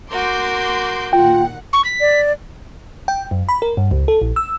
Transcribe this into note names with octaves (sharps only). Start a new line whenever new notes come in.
F#4 A#4 C6 D6 G6
D#2 A#2 F4 F#5 G5
C#6
B6
D5
G5
F#2
B5
A#4
G2
C#2
A4
A#1
E6